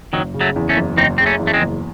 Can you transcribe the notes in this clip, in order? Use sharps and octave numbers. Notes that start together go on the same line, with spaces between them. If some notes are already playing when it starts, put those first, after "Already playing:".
F#1 D#3 F#3
C#3
F#3 A3
E2
A3 C#4
F#1
F#1 C4 D#4
C#3 C4
A3 C#4
E2
A3
G#3 C4
F#1